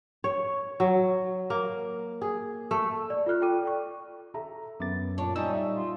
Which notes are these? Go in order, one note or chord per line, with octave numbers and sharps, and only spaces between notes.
C#5
F#3
A#3
G#4
A3
D5
F4 A4 F6 F#6
F4 A4 G5 D6 D#7
D5 G5 C#6
A4 E5 A#5
F#2 B3 E5 D6 A6
A#2 D4 C#5
G3 C#4 D#4 E6
E5
F4